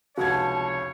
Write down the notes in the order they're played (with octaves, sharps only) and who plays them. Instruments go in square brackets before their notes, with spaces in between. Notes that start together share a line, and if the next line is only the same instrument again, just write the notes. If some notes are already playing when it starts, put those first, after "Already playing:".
[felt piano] F1 C#2 G#6 [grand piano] F#4 [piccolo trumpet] C#5 [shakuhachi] A5